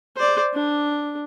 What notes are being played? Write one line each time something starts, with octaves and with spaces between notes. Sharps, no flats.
C5 D5
D4